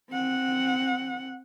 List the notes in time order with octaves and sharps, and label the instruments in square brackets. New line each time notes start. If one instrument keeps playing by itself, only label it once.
[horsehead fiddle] C4 F#5